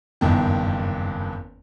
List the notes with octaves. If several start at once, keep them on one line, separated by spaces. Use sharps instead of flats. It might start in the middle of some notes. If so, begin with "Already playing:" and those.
F#1 E2 G2 D#3